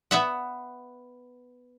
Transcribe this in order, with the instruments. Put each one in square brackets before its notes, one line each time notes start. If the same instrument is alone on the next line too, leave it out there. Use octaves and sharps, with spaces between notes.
[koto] B3 E5 F#5